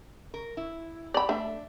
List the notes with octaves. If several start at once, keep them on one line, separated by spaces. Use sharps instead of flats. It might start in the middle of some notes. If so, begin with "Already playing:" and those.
A#4
E4
G4 D5 B5
A3 D4 E5